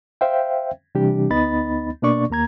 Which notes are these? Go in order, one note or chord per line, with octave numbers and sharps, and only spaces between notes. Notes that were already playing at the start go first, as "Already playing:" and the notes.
C5 E5 F5 G5
C3 E3 G3 D4 G4
D2 B3 D#4 D#5 B5 A6
B2 A#3 D4 D5 C#6
D#2 A#3 A#5 G#6